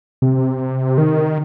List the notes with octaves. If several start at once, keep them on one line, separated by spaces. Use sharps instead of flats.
C3
D#3